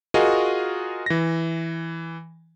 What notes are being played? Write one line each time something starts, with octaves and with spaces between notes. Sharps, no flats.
F4 F#4 G#4 A#4 D#5
E3 A#6